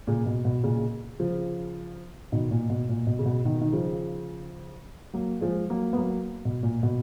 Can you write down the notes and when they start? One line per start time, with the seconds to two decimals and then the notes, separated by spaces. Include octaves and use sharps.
0.07 A#2 C#3
0.26 B2
0.45 B2
0.63 A#2 C#3
1.19 C#3 F3
2.32 B2 D#3
2.51 A#2
2.70 B2
2.89 A#2
3.07 B2
3.19 C#3
3.26 B2
3.45 B2 D#3
3.61 D#3
3.72 C#3 F3
5.13 F#3 A#3
5.41 F3 G#3
5.70 F#3 A#3
5.93 B3
5.97 F#3 A#3
6.45 B2
6.63 A#2
6.83 B2